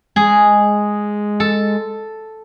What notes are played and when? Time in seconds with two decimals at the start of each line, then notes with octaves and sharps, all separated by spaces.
0.16 G#3 G#4
1.40 A4